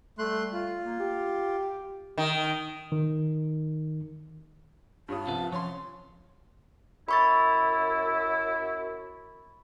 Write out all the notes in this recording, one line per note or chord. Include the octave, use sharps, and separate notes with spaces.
G3 A3 C6 F#6
F4
A#3
G4
D#3
D#3
G2 F4 C#5 A5 D#6
C2 F3 C#4 B4
F3 C#4 C#5 C6
F#2 E4 B5 C#6 A6